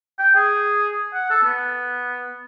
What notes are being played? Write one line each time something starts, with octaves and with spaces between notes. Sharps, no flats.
G5
G#4
F#5
A4
B3